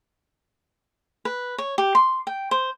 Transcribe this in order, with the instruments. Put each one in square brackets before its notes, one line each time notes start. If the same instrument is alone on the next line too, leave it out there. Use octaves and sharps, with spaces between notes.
[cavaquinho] B4
C#5
G4
C6
G5
C5